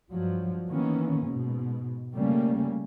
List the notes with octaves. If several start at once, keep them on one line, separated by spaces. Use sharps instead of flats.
G2 F3 F#3
D#3 E3 A#3 B3 C#4
G#2 B2
C#3 G3 A3 A#3 C#4